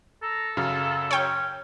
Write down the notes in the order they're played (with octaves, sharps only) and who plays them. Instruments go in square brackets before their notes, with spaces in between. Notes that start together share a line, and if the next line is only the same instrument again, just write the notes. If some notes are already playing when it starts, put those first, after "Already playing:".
[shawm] A4 [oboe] A#5
[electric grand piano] F#2 C#3 [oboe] F5
[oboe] C#4 [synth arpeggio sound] C#5 G5